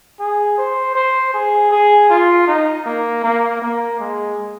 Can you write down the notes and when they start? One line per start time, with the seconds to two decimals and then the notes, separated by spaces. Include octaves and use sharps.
0.20 G#4
0.58 C5
0.95 C5
1.34 G#4
1.71 G#4
2.10 F4
2.48 D#4
2.86 A#3
3.24 A#3
3.62 A#3
4.00 G#3